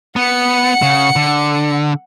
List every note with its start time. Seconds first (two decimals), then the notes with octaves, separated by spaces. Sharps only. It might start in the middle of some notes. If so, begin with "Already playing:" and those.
0.16 B3 F#5 C#7
0.82 C#3
1.16 D3